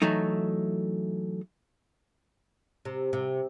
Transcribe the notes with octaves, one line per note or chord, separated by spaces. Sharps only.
E3 F#3 A3 D#4
C3
C3